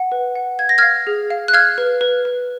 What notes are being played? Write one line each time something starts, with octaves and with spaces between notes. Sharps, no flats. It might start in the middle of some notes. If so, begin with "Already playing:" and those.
Already playing: F#5
B4
F#5
F5 G#6
A#6
F5 F6 G#6
G#4
F5
F#6
F5 F6 G#6
B4
B4
B4